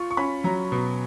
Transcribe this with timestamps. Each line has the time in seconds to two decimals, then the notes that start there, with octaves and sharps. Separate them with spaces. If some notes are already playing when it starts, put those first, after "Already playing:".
Already playing: F4 C#6
0.11 C#6
0.17 C#4 B5
0.44 F#3 A#5
0.72 B2